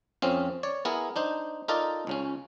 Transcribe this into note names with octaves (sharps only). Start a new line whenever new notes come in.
F2 C4 C#4 F5
C#5 D5
B3 E4 G#4 A#4
D4 D#4 C5
D#4 F4 A4 A#4 D5 D#5
C#2 C#3 C#4